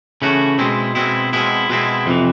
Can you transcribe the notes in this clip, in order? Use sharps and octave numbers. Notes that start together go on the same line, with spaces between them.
C#3 E3 A3 C#4 F#4
B2 G#3 C4 E4
B2 G#3 C4 E4
B2 G#3 C4 E4
B2 G#3 C4 E4
F2 C3 E3